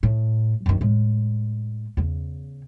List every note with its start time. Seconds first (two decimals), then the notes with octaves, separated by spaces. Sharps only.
0.03 A2
0.66 F#2 D#3
0.81 A2 G#3
1.97 E2 C#3